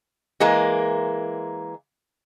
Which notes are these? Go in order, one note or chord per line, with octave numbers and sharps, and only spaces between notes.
E3 G#3 A#3